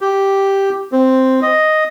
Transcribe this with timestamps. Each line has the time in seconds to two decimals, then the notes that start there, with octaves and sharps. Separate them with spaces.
0.01 G4
0.92 C4
1.42 D#5